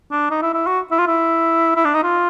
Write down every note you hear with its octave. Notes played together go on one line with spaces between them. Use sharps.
D4
D#4
E4
E4
F#4
E4
F4
E4
E4
D4
D#4
F4